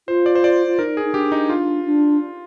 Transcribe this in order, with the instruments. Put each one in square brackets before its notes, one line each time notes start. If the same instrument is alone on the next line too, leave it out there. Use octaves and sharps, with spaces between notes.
[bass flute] F4 [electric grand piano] C5
[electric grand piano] D5
C5
D5
[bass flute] F4
[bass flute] D#4 [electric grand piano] A#4
[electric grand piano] G#4
[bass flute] D#4
[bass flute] D4 [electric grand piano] G4
[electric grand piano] D#4
F4
[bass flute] D4